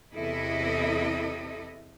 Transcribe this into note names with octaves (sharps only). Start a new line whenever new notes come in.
E2 C3 E4 A4 D#5